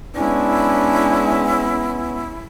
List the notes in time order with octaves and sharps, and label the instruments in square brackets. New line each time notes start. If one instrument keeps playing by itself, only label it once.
[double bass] G#3 C#4 [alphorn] B3 [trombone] D4 [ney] E4